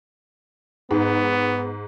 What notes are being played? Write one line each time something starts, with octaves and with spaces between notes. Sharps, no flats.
G#2 B3